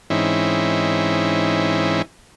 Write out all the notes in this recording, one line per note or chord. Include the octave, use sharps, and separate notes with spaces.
G#2 E3 C4 C#4 D#4 E4